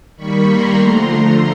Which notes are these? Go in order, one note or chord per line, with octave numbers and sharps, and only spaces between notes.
D#3 G3 A#3 B5 C#6
A#5 C6
D3 F3 A3